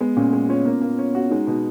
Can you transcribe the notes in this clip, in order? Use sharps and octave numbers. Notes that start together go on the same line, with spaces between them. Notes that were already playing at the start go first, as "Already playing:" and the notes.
G#3 B3
A#2 C#4
G#3
C#4 F4
A#3
A#3
C#4
F#4
G#3 D#4
B2